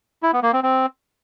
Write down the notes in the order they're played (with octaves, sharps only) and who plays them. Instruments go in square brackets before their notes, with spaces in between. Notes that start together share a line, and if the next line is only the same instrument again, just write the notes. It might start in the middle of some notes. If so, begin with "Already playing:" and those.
[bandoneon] E4
B3
A#3
C4
C4